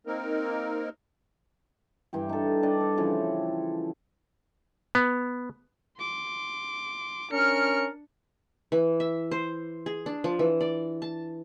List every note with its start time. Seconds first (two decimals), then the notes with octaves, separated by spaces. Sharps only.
0.07 A#3 C4 D#4 A#4
2.13 G2 E3 G4
2.29 D#4 A4
2.63 D4 G4 D5 D#5
2.81 A4
2.97 C#3 E3 F3
4.95 B3
5.98 C6 D6
7.32 C#4 D4 A#4 F6 C#7
8.72 E3
9.00 E5
9.31 C5
9.86 G#4
10.06 D4
10.24 F3
10.39 E3
10.61 D5
11.02 A5